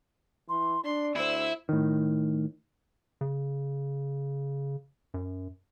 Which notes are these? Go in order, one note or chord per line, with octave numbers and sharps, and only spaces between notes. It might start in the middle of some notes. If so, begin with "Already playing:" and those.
E3 C6
D4 D5 C6
D2 E4 C5 E6
A2 D#3
C#3
F#2